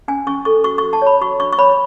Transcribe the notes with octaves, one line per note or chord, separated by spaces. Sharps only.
C#4 G#5
C#4 C#6
A4 C#6
F#4 C#6
C#6
F#4
A5
C#5 B5
F#4 C#6
D4 C#6
C#6
C#5 B5